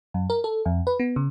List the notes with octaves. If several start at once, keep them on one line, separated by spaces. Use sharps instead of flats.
F#2
A#4
A4
F2
B4
B3
C#3